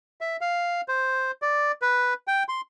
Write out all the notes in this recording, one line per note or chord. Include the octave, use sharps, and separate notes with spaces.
E5
F5
C5
D5
B4
G5
C6